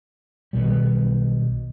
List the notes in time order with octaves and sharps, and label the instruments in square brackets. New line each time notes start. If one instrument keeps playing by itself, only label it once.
[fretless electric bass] B1 B2 D#3 G3